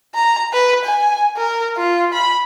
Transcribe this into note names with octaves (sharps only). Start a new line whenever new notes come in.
A#5
B4
G#5
A#4
F4
B5